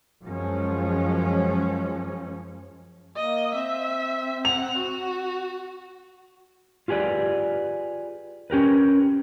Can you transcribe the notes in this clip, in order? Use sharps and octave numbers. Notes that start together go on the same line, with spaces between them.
F#2 F3 G#3 C#4
A#3 D#5
C4 E5
F#5 F7
F#4
F4 G4 G#4 B4 D5
C#4 G4 A#4 B4